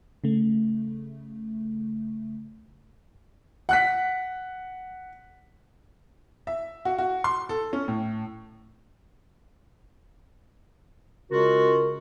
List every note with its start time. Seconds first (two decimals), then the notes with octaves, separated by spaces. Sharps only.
0.24 C#3 A3
3.69 F#5 F#6 B6
6.47 E5
6.85 F#4
6.98 F#4
7.24 C6
7.49 A4
7.73 C#4
7.88 A2
11.32 C#3 G#3 F4 F#4 A#4